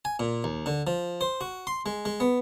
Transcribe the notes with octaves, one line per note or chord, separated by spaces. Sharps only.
G#5
A#2
D#2
D3
F3
C5
F#4
C6
G#3
G#3
B3